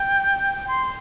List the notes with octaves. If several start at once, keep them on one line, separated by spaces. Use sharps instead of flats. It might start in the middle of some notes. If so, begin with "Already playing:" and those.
Already playing: G5
C6